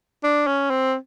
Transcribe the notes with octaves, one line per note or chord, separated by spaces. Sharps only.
D4
C#4
C4